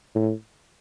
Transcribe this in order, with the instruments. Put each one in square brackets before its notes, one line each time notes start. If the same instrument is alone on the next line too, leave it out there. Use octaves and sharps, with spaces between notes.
[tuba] A2